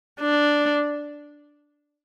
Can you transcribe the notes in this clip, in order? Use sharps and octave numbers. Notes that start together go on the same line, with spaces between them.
D4